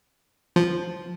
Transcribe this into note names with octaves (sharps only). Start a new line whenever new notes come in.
F3